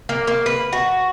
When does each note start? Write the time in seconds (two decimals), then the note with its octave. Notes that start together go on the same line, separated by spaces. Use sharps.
0.09 A#3
0.27 A#3
0.46 B4
0.73 F#4